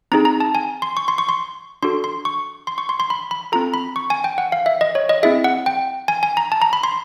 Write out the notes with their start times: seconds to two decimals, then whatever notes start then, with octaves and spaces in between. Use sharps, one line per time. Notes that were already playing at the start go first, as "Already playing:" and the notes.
0.12 C4 D#4 G#4 A#5
0.25 A#5
0.40 A5
0.55 G#5
0.82 C6
0.97 C#6
1.08 C6
1.18 C#6
1.29 C6
1.83 D4 F#4 A4 C6
2.04 C6
2.25 C#6
2.67 C6
2.78 C#6
2.89 C6
3.00 C6
3.10 B5
3.31 B5
3.52 C4 F4 A4 A#5
3.74 B5
3.96 C#6
4.10 G#5
4.24 G5
4.38 F#5
4.52 F5
4.66 E5
4.81 D#5
4.95 C#5
5.09 D#5
5.23 C4 E4 G#4 E5
5.44 F#5
5.66 G5
6.08 G#5
6.23 G#5
6.37 A#5
6.52 A5
6.62 A#5
6.73 B5
6.83 C6